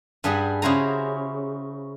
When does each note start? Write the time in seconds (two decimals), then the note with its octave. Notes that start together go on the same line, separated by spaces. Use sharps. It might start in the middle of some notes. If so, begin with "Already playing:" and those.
0.24 G2 G3 G#4 F#5 B5
0.62 C#3 E4 F#4 C5 G#5 A#5